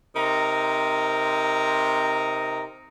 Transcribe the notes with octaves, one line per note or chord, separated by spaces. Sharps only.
C3 D#4 A#4 A#5